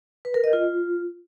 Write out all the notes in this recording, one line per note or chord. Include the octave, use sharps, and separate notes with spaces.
B4
A#4
D#5
F4